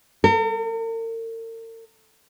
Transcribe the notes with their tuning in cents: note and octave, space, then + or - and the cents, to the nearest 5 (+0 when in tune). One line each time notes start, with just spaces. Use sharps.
A#4 -45